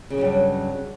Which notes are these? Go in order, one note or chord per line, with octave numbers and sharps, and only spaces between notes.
G2 C#3 F#3 G3 C#4